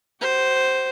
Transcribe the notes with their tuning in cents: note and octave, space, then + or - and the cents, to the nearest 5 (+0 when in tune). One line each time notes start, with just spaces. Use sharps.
F#4 +45 C5 +0